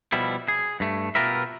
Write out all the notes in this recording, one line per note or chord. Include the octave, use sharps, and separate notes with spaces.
B2 F3 G3 E4
G#4
G2 A3
B2 F4 G4 A#4 B4 E5